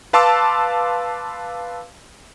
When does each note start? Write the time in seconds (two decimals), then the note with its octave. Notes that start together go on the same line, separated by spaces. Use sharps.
0.13 B4 F5 A5 C6 D6 E6